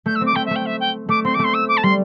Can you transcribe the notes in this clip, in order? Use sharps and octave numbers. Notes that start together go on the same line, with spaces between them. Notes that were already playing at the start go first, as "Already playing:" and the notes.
A3 G6
E6
C4 D6
A3 G5
E5
A3 G5
E5
G5
A3 D6
C4 C6
D6
A3 C6
E6
D6
A5
G3 C6